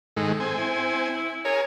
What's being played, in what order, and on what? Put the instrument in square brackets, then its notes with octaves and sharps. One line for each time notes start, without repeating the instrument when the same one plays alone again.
[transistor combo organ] G#2 D#3 G#3 [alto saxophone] A4
[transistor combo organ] C4 G#5
[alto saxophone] E4
[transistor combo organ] G#4 A#4 [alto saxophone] C#5